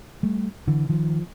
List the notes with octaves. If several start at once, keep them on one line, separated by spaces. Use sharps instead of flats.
G3 A3
D3 E3
D#3 F3